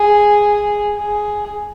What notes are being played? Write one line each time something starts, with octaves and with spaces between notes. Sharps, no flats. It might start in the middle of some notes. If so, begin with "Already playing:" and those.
Already playing: G#4
G#4